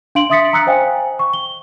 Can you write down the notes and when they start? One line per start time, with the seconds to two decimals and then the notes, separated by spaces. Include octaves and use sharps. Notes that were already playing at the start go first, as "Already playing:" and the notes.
0.15 D4 F5 C6 D7 F#7
0.30 E5 C6 D#6 A6 B6 C#7
0.53 A#5 D#6 E6 F#6 C#7
0.67 C5 D#5 F5 G5 G#5
1.19 C#6
1.34 G7